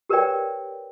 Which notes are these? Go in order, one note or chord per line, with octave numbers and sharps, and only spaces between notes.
G4 A#4 B4 C#5 D5 G5